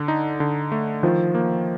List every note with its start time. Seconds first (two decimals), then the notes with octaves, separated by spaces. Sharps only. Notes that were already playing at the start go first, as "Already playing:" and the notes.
Already playing: D3
0.08 D#4
0.40 D3
0.72 A3
1.03 D#3 F3
1.35 A#3